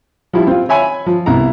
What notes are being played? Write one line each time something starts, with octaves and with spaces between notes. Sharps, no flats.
F3 G3 E4
C4 F4
C#5 E5 G#5 B5
F3
C2 B3 E4 A#5